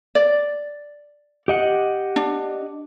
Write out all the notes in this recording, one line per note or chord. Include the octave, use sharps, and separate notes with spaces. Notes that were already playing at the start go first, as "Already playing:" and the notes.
D5
G4 D#5 F#5
D4